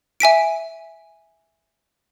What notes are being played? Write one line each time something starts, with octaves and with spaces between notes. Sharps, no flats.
E5 G#5 B6 D7